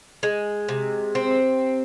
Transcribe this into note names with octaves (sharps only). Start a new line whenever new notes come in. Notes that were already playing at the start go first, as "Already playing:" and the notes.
G#3
C3
C4